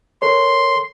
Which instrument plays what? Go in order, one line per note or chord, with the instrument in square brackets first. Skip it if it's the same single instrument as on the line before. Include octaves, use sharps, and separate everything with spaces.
[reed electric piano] A4 A#4 C#5 [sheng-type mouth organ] C6